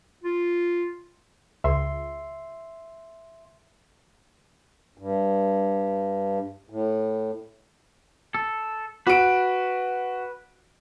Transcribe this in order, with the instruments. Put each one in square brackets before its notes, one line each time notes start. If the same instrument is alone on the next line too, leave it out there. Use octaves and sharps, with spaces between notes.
[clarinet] F4
[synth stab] C#2 [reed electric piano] E5 C6
[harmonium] G2
A2
[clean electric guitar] A4
[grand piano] F#4 D7 [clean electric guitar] B4